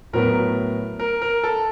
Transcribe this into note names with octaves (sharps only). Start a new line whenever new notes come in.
A2 F#3 B3 A#4
A#4
A#4
A4